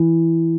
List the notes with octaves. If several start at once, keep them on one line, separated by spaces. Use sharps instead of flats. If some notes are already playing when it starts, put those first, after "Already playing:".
Already playing: E3